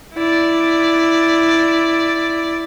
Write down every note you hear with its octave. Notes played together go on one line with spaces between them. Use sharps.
E4 D5